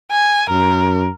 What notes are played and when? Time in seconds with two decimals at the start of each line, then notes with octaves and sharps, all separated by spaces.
0.12 G#5
0.50 F#2 A#4